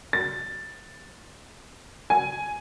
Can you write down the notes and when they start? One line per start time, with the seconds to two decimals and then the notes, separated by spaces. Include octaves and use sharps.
0.13 A6
2.10 G#5